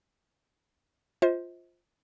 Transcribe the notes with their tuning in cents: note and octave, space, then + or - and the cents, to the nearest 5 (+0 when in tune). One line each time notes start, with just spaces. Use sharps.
F4 +0 C5 +0 D#5 +45